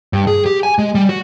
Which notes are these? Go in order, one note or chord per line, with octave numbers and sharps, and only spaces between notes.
G2
G#4
G4
G#5
G#3
G3
F#4